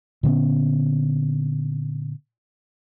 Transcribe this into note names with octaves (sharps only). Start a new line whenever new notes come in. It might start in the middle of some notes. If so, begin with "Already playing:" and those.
A#2 D3 B3 C#4